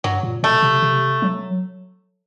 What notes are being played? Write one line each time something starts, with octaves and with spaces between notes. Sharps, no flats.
G2 F#3
A#2
B2 A3
C3
C3
F#3